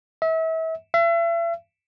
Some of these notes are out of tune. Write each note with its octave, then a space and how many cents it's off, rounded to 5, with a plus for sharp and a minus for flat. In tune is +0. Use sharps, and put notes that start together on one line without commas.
E5 -35
E5 +40